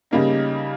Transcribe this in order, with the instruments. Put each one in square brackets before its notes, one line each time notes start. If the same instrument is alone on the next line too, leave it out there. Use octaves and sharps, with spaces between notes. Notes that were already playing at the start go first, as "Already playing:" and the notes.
[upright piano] C#3 G3 A#3 D#4